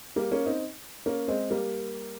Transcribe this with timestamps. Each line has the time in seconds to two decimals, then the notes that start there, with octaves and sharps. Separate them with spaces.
0.16 G3 A#3
0.32 A#3 C#4
0.46 C4 D#4
1.06 A#3 C#4
1.28 G#3 C4
1.50 G3 A#3